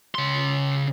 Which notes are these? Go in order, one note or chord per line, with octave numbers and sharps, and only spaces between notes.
C#3 C6